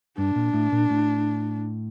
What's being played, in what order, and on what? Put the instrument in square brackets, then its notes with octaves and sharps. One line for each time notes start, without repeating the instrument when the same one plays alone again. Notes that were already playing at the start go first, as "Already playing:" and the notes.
[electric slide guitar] G2 [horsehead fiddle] D4
[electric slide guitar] A#2
A2
A#2
A2